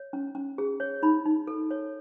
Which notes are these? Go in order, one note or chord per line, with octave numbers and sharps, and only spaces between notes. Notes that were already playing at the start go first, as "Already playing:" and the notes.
Already playing: C#5
C#4
C#4
G#4
C#5
D#4 B5
D#4
A4
C#5